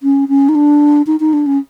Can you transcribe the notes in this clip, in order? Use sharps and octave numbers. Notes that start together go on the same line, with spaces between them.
C#4
C#4
D#4
D4
D#4
D#4
D4
C#4